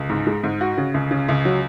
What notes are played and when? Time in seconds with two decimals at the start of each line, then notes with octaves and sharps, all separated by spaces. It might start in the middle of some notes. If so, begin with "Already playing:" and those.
Already playing: C#2
0.09 G#2
0.27 G#3
0.44 G#2
0.61 F#4
0.77 C#3
0.94 C#2
1.11 C#3
1.29 C#2
1.45 F#3